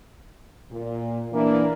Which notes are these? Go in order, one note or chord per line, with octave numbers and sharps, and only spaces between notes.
A#2
E3 A#3 D4